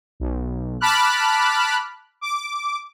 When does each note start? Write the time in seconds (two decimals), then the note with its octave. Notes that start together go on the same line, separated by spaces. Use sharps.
0.20 B1
0.81 A5 B5 D6 F6 F#6
2.21 D6